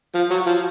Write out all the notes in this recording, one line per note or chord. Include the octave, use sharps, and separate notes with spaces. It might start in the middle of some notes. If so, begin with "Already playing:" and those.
F3
F#3
F3